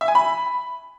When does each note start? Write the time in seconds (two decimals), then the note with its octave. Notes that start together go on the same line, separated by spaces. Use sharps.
0.01 E5
0.08 G#5
0.15 B5